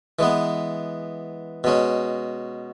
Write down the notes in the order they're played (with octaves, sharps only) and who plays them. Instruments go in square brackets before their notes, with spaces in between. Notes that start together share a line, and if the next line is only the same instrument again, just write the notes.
[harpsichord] E3 G#3 B3
B2 G#3 C#4